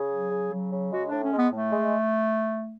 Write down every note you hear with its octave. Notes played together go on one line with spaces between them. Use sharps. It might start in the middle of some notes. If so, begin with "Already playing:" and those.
Already playing: C#3 G#4
F#3
C#3
F#3
C#3
G#3 F#4
A2 D4
C#4
G#3 B3
A2 A3
G#3